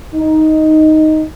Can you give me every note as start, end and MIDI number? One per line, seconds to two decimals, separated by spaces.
0.15 1.24 63